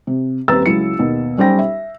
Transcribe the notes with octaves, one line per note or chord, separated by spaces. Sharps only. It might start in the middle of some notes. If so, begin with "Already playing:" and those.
C3
D#1 C4 B4 A#5 E6 A6
C#2 F#3 E4 C#7
D#2 B2
B1 G3 C#4 C5 G5 A#6
E5